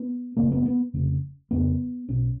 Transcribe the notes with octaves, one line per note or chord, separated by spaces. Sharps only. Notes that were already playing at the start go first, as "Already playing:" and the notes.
Already playing: B3
F#1 F2 C#3 A#3
B3
B3
F1 F2 C#3
F1 F2 C#3 B3
B1 B2 C#4